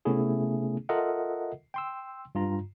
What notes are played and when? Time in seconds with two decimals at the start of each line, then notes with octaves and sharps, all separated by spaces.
0.05 C3 A3 B3 C#4 E4 G#4
0.89 F4 A4 A#4 D#5 E5 F#5
1.74 G5 C6 E6
2.35 G2 F4 A#5